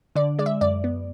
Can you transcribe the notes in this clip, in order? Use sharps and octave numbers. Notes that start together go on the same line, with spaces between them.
D3 D5
G#3 D5
E5
F#2 D5
B3